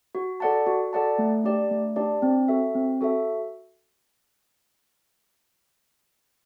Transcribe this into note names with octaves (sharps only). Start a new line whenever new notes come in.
F#4
A4 D5 F#5 A5
F#4
A4 D5 F#5 A5
A3
D4 G4 D5
A3
D4 G4 D5
C4
F#4 A4 E5
C4
F#4 A4 E5